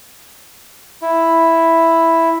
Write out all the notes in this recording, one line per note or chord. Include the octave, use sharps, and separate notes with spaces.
E4